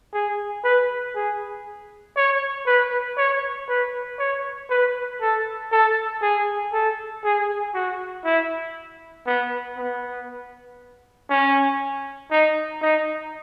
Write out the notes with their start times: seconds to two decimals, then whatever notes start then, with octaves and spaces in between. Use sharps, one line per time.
0.14 G#4
0.64 B4
1.15 G#4
2.17 C#5
2.67 B4
3.17 C#5
3.68 B4
4.19 C#5
4.70 B4
5.21 A4
5.72 A4
6.22 G#4
6.73 A4
7.24 G#4
7.74 F#4
8.25 E4
9.26 B3
9.77 B3
11.30 C#4
12.31 D#4
12.82 D#4